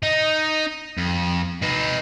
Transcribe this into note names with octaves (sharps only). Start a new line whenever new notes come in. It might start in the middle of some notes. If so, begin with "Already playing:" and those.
D#4
F2
D#4 B4